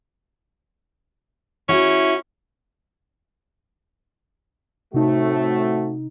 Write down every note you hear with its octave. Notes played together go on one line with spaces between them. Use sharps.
C#4 E4 F#4
A2 C3 A3 C4 D#4 F#4